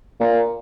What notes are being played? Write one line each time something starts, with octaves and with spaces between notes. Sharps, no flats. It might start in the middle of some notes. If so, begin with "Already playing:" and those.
A#2